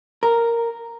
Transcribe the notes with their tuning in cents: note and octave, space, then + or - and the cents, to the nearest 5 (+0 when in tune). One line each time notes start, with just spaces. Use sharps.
A#4 -5